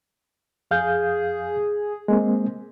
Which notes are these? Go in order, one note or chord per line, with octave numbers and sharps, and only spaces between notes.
F2 G#4 F5 G6
G#3 A#3 C4